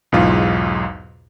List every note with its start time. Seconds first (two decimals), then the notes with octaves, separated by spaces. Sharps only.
0.12 B1 E2 G#2 F4